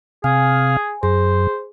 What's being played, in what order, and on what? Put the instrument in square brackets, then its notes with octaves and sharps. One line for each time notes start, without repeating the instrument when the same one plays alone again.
[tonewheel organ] C3 F5 [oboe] G#4 [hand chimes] G#5
[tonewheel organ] F#2 [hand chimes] G#4 [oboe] C5